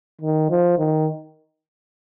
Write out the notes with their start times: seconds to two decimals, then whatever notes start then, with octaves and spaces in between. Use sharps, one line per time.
0.21 D#3
0.50 F3
0.78 D#3